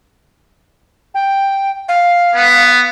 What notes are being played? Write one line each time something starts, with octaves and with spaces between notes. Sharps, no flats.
G5
F5
B3